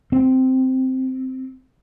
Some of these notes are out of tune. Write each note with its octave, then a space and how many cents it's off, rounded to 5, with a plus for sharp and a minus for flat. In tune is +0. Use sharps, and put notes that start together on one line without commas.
C4 -5